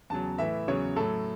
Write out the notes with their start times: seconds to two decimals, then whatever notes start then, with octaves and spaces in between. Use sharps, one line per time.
0.10 E2 C#3 F#3 A5
0.38 A2 E3 E5
0.68 E2 C#3 F#3 C#5
0.96 A2 F#3 A4